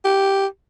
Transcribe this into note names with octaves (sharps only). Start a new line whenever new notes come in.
G4